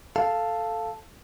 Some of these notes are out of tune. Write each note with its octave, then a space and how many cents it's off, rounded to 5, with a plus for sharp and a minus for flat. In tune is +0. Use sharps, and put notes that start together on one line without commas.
A4 +0 F5 +0